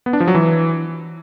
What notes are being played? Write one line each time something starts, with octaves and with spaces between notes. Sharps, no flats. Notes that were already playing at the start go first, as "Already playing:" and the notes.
B3
D4
F3
F#3
E3